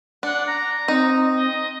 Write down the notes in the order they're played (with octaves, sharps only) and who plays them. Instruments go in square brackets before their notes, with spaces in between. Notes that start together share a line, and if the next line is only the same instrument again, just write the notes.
[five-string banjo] D4 [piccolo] F#5
[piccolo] A#5
[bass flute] C4 [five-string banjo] D#4
[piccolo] D#5